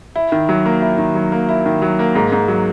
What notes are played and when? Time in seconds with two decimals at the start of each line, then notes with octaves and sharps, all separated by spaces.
0.16 E4
0.32 D#3
0.49 F#3
0.66 A#3
0.82 E4
0.98 D#3
1.15 F#3
1.32 A#3
1.49 E4
1.66 D#3
1.82 F#3
1.99 A#3
2.15 G#2
2.32 G#2
2.48 F#3